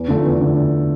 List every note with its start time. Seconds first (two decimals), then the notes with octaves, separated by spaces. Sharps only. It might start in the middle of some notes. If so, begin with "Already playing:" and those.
Already playing: E2
0.08 D3 F3 A3
0.24 E2
0.41 D3